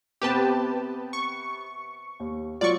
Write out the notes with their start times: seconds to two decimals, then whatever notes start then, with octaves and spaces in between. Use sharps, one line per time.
0.22 C3 B3 C4 G4 B4 A5
1.13 C#6
2.20 D#2
2.61 F#3 F4 D5 C#6